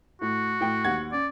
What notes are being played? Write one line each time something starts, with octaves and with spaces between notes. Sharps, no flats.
A2 F#4
A2 G5
D#2 F#5 G#6
C#4 D5